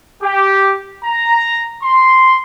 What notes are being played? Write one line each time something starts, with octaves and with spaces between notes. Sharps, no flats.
G4
A#5
C6